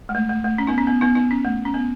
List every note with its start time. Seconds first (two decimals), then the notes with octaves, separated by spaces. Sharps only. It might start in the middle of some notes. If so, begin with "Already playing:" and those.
0.09 G#3
0.15 A3
0.29 A3
0.44 A3
0.58 C#4
0.67 B3 D#4
0.78 C#4
0.87 B3
1.01 B3 D#4
1.15 B3 D#4
1.31 C#4
1.45 A3
1.65 C#4
1.74 B3